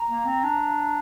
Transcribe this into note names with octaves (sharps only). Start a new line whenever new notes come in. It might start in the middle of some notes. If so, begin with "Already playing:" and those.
Already playing: A#5
A#3
C4
D4